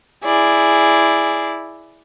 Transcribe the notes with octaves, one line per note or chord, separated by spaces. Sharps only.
E4 G#4 D5